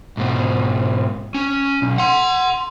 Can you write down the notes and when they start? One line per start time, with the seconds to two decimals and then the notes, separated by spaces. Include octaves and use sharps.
0.17 G#2 B2
1.35 C#4
1.82 B1
1.98 F#5 C6